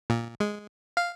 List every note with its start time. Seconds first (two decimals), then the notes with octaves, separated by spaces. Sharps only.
0.10 A#2
0.40 G#3
0.97 F5